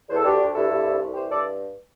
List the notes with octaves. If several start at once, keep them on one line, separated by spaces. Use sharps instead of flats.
E2 C5
A4
D2 D4 G4
D2
G2 E4 A4
G2
C2
C2
E3 G4 C5
G2 A4 D5